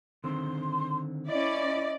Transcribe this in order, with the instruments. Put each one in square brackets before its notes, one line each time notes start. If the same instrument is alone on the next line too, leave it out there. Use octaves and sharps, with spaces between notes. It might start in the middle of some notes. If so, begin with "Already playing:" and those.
[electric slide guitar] D3 D#3 C4 [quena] C6
[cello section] C#4 E4 [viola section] D5 [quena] D#5